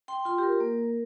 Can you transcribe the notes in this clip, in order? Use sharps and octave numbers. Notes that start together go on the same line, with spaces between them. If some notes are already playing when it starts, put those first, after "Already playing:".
G5 C6
F4 G5 C6
G4
A#4
A#3